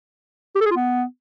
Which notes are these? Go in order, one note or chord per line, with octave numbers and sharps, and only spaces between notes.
G4
A4
G#4
F4
B3